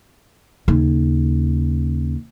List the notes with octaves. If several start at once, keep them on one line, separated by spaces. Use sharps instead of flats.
D#2 C#3